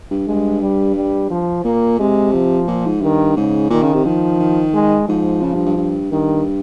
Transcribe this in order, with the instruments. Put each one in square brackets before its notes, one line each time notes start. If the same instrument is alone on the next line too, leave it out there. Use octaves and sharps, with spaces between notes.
[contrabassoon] G2
[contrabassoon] G2 [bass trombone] G#3
[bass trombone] G3
G3
F3
[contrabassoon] A#2 [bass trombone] A#3
[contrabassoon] C3 [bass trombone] G#3
[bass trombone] F3
[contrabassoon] A#2
G#2
[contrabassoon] G2 [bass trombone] D#3
[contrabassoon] G#2 [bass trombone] C#3
[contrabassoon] A#2 [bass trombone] D#3
[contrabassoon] C#3
C3
[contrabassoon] D#3 [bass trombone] F3
[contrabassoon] D#3
[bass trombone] G#3
[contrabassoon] G#2 [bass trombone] F3
[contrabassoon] C#3
G2
G2
G2
[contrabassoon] G2 [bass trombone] D#3